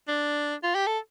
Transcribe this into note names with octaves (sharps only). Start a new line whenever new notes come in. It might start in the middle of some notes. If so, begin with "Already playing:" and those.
D4
F4
G4
A4